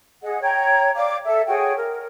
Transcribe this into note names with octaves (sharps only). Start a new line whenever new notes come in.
G#4 D#5 F#5
C#5 G5 A#5 G#6
D5 F5 D6
A4 E5
F#4 G#4 C#5 G5
A#4